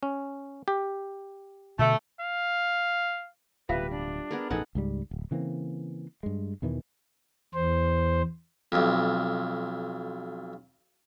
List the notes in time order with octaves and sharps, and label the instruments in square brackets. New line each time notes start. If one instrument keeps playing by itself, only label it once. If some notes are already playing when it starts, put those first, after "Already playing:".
[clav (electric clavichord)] C#4
G4
[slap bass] B2 D3 [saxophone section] A3
[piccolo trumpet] F5
[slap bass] D1 B2 [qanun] G3 [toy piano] F4 E5 F5 [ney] B4
[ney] D4
[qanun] B3 G#4 A#4
[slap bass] A1 F2 B2 [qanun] D#4 A4 F#5 [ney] G#4
[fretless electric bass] C#2 G#2 G3
D1
C#3 E3 A#3 C4
G2 G#3
E2 B2 D#3 E3
[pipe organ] E2 C5
[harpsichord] B1 F2